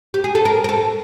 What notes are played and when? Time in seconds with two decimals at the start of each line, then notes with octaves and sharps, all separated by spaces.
0.14 G4
0.24 G#4
0.35 A4
0.45 A#4
0.64 A#4
0.69 A4